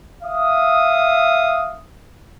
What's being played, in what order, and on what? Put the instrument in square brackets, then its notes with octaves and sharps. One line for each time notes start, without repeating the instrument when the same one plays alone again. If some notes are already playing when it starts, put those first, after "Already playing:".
[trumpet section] E5 F5 D#6